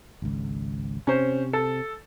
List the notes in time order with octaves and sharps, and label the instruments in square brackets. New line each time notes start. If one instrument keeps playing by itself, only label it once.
[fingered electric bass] G#1 C#2
[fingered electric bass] C3 [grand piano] C#4 C5
[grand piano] A4